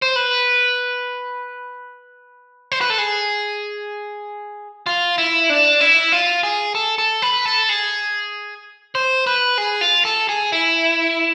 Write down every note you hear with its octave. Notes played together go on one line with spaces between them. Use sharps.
C5
B4
C5
B4
A4
G#4
F4
E4
D4
E4
F4
G#4
A4
A4
B4
A4
G#4
C5
B4
G#4
F4
A4
G#4
E4